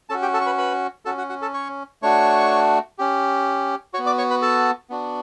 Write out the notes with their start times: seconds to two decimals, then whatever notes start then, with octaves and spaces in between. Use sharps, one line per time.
0.10 C#4 F#4 A4 A5
0.22 G4 G5
0.34 A4 A5
0.41 C#6
0.46 B4 B5
0.58 B4 B5
1.05 C#4 F#4 A4 A5
1.17 F#4 F#5
1.29 F#4 F#5
1.42 A4 A5
1.54 C#5 C#6
2.02 A3 D4 F#4 C#5 C#6
2.99 C#4 G4
3.94 F#4 C#5 C#6
3.99 B3
4.06 D5 D6
4.18 C#5 C#6
4.30 B4 B5
4.42 A4 A5
4.90 B3 D4 F#4